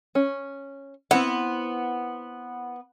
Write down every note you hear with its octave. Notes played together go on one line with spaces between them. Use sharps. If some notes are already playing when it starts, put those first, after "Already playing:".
C#4
B3 C4 E4 F#5